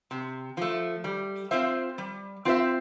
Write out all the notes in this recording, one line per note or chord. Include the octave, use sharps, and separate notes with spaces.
C3
F3 A3
G3
C4 F4 C5 E5
G3
C4 F4 C5 E5